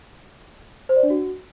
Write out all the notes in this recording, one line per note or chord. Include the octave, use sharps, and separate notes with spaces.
C5
D5
D4
F#4